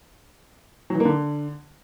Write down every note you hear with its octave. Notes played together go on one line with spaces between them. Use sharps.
F#3
E3
A#3
D3